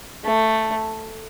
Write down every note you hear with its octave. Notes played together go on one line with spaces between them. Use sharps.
A3